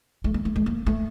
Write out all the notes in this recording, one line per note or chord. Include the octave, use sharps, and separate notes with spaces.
A3
A#3
A3
A3
A#3
A3